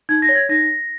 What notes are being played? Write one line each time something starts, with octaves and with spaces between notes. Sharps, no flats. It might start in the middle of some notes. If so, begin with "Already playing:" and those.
D#4 G#6
A#6
C#5
G#6
D#4 A#6